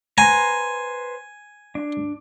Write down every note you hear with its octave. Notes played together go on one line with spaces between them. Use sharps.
B4 C5 G#5 A#5
D4